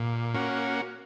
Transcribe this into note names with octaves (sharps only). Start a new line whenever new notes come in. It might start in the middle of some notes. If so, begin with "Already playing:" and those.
Already playing: A#2
A#3 C#4 F#4